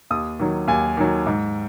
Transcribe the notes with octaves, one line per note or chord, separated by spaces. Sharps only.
D#2 D#6
D#3 F#3
D#2 G#5
D#3 F#3
G#2